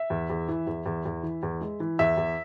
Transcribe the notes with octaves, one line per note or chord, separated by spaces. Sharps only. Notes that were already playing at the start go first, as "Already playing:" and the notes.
Already playing: E5
E2
E2
E3
E2
E2
E2
E3
E2
G#3
E3
E2 E5
E2